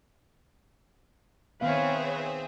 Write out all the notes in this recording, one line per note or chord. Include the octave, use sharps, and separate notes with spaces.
D#3 B3 C4 G#4 B4 C#5 E5 F5